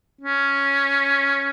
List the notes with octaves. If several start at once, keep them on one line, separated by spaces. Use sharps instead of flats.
C#4